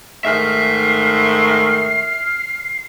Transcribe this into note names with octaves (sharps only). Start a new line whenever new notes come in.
G#2 D#3 A3 E5 F6 C7